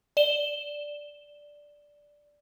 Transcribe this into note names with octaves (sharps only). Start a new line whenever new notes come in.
D5 E7 G7